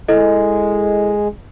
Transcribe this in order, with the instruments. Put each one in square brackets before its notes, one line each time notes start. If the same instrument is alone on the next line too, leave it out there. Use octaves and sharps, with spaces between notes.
[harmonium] G#3 [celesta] E4 A4 D#5